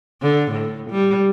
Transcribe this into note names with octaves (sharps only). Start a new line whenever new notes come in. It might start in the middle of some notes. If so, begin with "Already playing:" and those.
D3
A2
G3